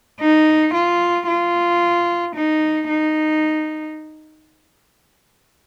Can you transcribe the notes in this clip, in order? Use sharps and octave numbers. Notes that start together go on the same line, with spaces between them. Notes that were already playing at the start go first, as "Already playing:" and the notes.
D#4
F4
F4
D#4
D#4